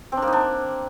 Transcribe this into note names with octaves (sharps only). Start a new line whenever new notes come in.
C4
D4
A#3
D#4
D4